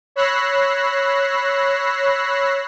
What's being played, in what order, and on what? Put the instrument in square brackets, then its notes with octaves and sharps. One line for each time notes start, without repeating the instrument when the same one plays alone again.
[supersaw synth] C#5 B5 E6 F#6 A#6 C7